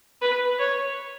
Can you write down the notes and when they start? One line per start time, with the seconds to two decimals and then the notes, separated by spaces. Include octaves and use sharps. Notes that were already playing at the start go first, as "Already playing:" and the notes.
0.21 B4
0.59 C#5